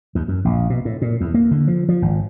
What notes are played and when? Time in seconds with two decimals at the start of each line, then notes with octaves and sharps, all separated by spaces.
0.15 D#2
0.28 F#2
0.45 A#1
0.70 B2
0.85 A2
1.02 A#2
1.21 E2
1.34 A#3
1.51 D3
1.67 F3
1.89 F3
2.02 G#1